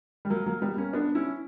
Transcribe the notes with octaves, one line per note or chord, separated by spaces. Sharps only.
G3
F#3 A#3
F#3 A#3
G3 B3
A#3 C#4
B3 D4
C#4 E4